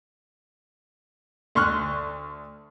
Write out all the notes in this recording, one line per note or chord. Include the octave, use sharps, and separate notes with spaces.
D2 C6 C#6 F6 F#6